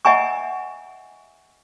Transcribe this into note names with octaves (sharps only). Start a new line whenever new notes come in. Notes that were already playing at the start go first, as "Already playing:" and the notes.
D#5 E5 F#5 G#5 A#5 C#6